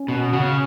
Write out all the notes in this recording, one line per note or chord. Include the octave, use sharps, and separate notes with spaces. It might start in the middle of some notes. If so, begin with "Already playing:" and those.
Already playing: C#4
B2
C#3